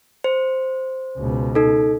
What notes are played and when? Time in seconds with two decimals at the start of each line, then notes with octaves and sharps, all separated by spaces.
0.24 C5
1.18 C#2 B2
1.55 D#4 A4